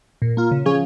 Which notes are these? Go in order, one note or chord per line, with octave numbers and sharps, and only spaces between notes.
A#2
A#3 F4
C#3
F3 C#4 G#4